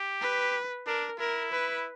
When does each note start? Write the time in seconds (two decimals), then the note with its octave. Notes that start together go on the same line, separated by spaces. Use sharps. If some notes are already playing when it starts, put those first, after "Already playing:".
Already playing: G4
0.21 B4
0.87 D4 A#4
1.19 E4 A#4
1.52 B4